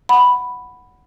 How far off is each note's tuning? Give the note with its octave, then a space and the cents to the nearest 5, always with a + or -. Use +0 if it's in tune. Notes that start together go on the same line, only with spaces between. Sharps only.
F#5 +0 B5 +0